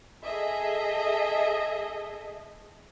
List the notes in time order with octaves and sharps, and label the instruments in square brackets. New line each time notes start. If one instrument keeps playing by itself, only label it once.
[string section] G#4 A4 D#5 E5